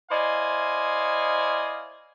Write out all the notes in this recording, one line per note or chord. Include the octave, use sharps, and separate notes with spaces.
E4 C5 D5 D#5 F5 G#5